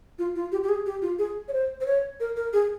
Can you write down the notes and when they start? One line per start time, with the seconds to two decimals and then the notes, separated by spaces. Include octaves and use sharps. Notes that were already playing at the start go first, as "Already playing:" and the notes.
0.19 F4
0.35 F4
0.52 G4
0.63 G4
0.69 G#4
0.86 G4
1.02 F4
1.19 G#4
1.48 C#5
1.53 C5
1.81 C5
1.86 C#5
2.20 A#4
2.36 A#4
2.53 G#4